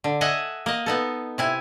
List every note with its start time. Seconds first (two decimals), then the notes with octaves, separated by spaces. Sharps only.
0.04 D3
0.21 D#5 E5 F#5 G#5
0.66 A#3 D#5
0.86 B3 D#4 A4
1.38 C3 E4 G#5